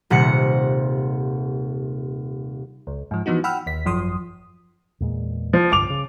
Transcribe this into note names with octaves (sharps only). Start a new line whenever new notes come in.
D#1 C3 F#5 C#7
C#2
G#2 F3
E3 F3 B3 D#4 F#4
F#5 G5 B5 E6 F6
D#2 B6
G#1 F#2 F3 C6 D#6
E2 A#2 G#3
F3
C2 G2 D3 D6 F7
C#3